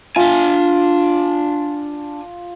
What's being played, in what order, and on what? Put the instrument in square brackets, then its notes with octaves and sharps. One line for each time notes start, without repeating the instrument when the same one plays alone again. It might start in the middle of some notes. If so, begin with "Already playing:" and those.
[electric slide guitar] D4 G#5 [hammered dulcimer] F4